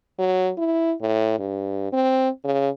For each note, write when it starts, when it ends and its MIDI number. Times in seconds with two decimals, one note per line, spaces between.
0.19 0.51 54
0.58 0.94 64
1.01 1.38 45
1.39 1.89 43
1.93 2.29 60
2.45 2.69 49